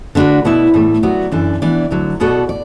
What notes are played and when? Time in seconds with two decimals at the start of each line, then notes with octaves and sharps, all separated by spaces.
0.15 D3 B3 D4 F#4 B4
0.45 B2 B3 E4 B4 D5
0.74 A2 E3 A3
1.03 F#3 B3 F#4 D5
1.32 F#2 E3 D4 A4 D5
1.62 E3 B3 D4 B4 D5
1.90 D2 D3 F#3
2.20 B2 B3 F#4 A4 D5
2.49 D5